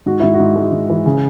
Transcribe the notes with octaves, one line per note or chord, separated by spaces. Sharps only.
G#2 F#4
G#2 E4
F#4
G#2
G#3
G#2
E3
C#3